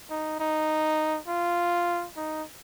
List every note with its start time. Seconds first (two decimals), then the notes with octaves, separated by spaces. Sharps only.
0.10 D#4
0.40 D#4
1.28 F4
2.16 D#4